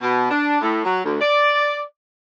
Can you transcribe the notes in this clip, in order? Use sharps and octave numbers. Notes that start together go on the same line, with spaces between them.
B2
D4
A2
F#3
D2
D5